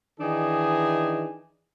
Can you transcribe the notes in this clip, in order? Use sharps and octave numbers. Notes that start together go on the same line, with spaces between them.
D#3 E3 D4 D#4 G#4